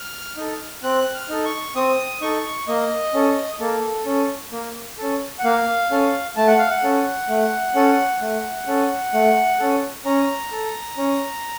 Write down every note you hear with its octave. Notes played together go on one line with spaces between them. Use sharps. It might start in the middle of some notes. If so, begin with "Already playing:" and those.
Already playing: F6
D#4 A4
C4 F#6
F6
D#4 A4
C#6
C4 D#6
D#4 A4 C#6
A#3 D#5
C#4 A4
A#3 A4
C#4 A4
A#3
C#4 A4
F#5
A#3 F5
C#4 A4
A3 A5
F#5
F5
F#5
C#4 A4
A3
C#4 A4
A3
C#4 A4
A3
C#4 A4
C#4 A#5
A4
C#4